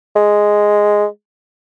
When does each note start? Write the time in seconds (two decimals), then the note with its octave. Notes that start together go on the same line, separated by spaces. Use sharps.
0.16 G#3